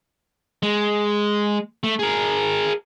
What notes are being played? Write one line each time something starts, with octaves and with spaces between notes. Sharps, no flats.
G#3
A3
G#4 A#4